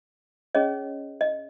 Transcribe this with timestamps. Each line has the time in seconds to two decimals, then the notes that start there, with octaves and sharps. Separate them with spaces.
0.55 C#4 G#4 C#5 D#5
1.21 D#5